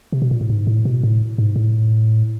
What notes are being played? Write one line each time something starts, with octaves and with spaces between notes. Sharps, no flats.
C3
B2
A#2
A2
G#2
A2
B2
A2
G#2
A2